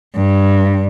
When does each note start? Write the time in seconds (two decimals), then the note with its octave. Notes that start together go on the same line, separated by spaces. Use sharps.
0.15 G2